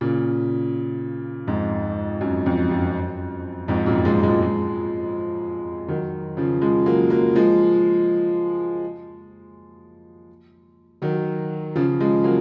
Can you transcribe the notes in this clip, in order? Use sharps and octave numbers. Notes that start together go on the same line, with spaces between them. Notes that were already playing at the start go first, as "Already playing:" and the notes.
A#2 C#3
F2 G#2
F#2
F2
F#2
F2 G#2
F#2 A#2
F3 G#3
F3 G#3
F3 G#3
D#3 F#3
C#3 F3
F3 G#3
F#3 A#3
F#3 A#3
F3 G#3
D#3 F#3
C#3 F3
F3 G#3
F#3 A#3